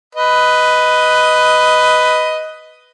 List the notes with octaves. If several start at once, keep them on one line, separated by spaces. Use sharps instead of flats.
B4 D#5